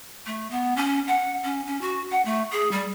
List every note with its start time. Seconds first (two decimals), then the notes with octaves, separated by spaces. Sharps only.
0.26 A3
0.51 B3
0.76 C#4
1.07 F#5
1.44 C#4
1.66 C#4
1.81 F#4
2.11 F#5
2.25 A3
2.52 G#4
2.71 G3